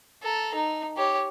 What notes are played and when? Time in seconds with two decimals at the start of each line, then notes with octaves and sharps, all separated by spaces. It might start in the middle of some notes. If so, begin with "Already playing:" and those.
0.23 A4 A#5
0.55 D#4
0.97 G4 C#5